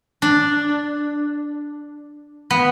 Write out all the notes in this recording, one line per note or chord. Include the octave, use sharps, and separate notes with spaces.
D4
B3